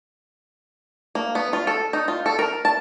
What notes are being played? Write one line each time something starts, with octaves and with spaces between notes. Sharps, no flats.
A#3
B3
F4
A4
D#4
F4
A4
A#4
A5